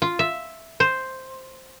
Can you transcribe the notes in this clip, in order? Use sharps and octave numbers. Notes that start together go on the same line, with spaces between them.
F4
E5
C5